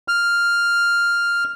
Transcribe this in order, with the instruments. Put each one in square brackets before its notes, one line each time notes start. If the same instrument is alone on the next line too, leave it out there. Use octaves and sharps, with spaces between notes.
[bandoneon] F6